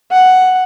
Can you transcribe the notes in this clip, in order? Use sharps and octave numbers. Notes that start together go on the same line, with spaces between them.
F#5